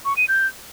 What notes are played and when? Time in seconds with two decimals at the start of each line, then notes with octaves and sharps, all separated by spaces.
0.05 C#6
0.17 D#7
0.28 G6